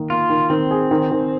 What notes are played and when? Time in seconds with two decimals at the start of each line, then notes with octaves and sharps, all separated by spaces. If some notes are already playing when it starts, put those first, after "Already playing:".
Already playing: D#3 A#3
0.10 A#3 F4
0.30 D#3
0.50 D#3 C4
0.71 G#4
0.91 D#3
1.11 D#3